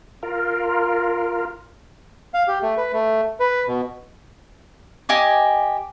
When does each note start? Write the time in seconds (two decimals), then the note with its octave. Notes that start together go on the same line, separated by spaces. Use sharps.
0.23 F4 A#4
2.34 F5
2.48 G4
2.62 A3
2.77 B4
2.93 A3
3.40 B4
3.68 B2
5.09 G4 D#5 G#5 D6